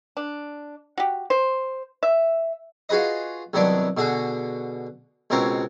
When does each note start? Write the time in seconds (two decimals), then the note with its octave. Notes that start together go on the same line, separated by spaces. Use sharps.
0.17 D4
0.97 F#4 G4
1.30 C5
2.03 E5
2.89 F4 F#4 G#4 B4 D#5
3.53 C2 D#3 F#3 B3 D4 D6
3.97 B2 D3 F#4 G#4
5.30 C#2 B2 C4 A#4 C#5